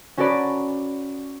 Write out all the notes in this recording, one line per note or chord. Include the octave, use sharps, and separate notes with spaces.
C#4 F#4 A4 A#4 D5 B5